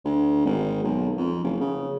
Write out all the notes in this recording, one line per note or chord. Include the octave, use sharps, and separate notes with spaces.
D2
G#1
B1
F2
F#1
C#3